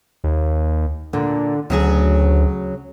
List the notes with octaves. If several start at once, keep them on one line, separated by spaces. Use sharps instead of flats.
D#2
A#2 D3
D2 C#3 F#3 G#4